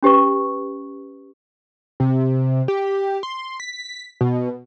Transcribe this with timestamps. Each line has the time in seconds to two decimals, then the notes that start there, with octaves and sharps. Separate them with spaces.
0.03 C#4 G4 B4 C#6
2.00 C3
2.68 G4
3.23 C6
3.60 B6
4.21 B2